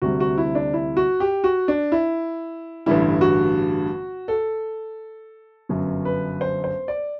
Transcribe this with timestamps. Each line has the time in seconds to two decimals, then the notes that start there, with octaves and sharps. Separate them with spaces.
0.02 D2 C3 G3 F#4
0.20 F#4
0.38 E4
0.55 D4
0.73 E4
0.97 F#4
1.20 G4
1.44 F#4
1.68 D4
1.92 E4
2.86 A1 G2 D3 G3 E4
3.21 F#4
4.28 A4
5.69 G1 F#2 F#3
6.05 B4
6.41 C5
6.64 C5
6.88 D5